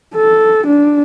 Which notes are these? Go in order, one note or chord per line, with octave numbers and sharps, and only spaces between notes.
A4
D4